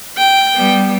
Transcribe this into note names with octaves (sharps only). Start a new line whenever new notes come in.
G5
G3 B3